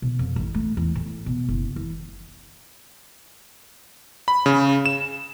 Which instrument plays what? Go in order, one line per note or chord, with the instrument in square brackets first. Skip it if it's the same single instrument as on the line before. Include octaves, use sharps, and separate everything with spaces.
[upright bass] B2
F2
A1
A3
E2
A2
B2
F#1
E3
[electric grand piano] B5
C#3
E7